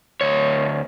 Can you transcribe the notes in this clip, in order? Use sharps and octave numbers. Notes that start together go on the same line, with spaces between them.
D2 C#5